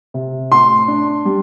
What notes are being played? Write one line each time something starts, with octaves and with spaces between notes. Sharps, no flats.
C3
A2 C6
D4
G3